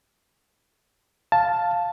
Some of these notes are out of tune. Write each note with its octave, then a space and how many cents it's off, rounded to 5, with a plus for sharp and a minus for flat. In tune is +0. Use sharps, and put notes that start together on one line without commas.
F5 +5 A5 +0